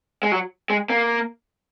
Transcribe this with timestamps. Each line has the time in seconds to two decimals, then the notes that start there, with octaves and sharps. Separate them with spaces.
0.23 G#3
0.32 F#3
0.70 G#3
0.90 A#3